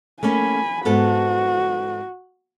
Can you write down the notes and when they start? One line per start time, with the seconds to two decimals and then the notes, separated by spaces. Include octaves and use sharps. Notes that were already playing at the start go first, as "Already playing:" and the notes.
0.23 A3 A#3 C#4 G#5 B5
0.85 G#2 B3 F#4 A4